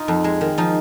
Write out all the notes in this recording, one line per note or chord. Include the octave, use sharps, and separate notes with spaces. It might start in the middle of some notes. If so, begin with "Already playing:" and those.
Already playing: D#4 F4
F2
G#3
D#3
F3 D#4